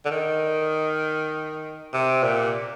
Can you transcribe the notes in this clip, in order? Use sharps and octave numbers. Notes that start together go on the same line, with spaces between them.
D3
D#3
C3
A#2